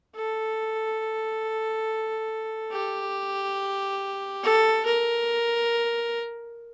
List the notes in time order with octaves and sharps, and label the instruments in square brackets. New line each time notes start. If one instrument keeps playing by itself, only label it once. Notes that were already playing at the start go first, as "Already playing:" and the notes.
[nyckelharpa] A4
G4
A4
A#4